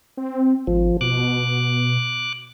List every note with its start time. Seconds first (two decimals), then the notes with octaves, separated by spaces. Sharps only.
0.17 C4
0.67 G#1 F3
1.01 B2 D6 F#6